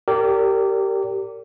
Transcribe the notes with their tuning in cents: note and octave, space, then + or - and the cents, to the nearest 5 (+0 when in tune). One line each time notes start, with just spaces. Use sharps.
G4 -15 A#4 -30 D5 -40